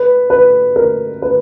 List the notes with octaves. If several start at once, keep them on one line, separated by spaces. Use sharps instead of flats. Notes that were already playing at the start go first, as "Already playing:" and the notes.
Already playing: B4
B4
A#4
B4